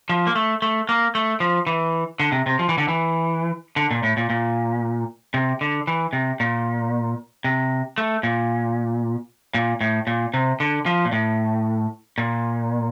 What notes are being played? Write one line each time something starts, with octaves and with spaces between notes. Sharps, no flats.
F3
A#3
A3
A3
A#3
A3
F3
E3
D3
C3
C3
F3
E3
D3
E3
D3
A#2
A2
A#2
A#2
C3
D3
E3
C3
A#2
C3
A3
A#2
A#2
A2
A#2
C3
D3
F3
A#2
A2
A#2